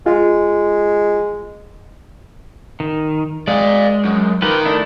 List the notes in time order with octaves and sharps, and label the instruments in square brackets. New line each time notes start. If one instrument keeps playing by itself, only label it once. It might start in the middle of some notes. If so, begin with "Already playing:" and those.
[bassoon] G#3 [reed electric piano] F4
[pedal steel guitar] D#3
[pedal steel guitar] G#3 [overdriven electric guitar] D5 F5
[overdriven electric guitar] F#2
[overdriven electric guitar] D#3 A#4 [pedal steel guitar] F4 G4 B4
[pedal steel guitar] A3 D4 E4